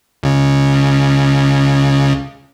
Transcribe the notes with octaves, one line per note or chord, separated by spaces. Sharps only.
C#2 C#3